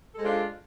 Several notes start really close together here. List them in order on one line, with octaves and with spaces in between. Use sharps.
A4 G#3 C5 F4 D4